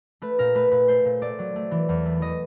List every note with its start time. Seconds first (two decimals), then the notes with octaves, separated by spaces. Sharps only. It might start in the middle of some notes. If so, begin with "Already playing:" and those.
0.22 A3 B4
0.39 A#2 A#4
0.55 A3 B4
0.72 A#2 B4
0.88 A3 C5
1.05 A#2
1.21 A3 D5
1.39 F#3
1.56 A3
1.71 E3
1.89 E2
2.06 A3
2.21 E3 D#5